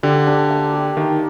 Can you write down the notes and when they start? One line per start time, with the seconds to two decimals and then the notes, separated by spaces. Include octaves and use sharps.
0.03 D3 G4
0.27 D4
0.50 A#3
0.73 G4
0.97 D#3 A#3